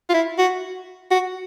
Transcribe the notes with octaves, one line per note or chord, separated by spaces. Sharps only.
F4
E4
F#4
F#4